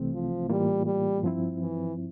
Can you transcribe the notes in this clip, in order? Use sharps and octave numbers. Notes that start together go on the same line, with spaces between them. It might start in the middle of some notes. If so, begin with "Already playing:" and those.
Already playing: C2 C3 E3 A3 C4
F3
A2 E3 G3 A#3 F4
G3
G2 F3 C4 E4
E3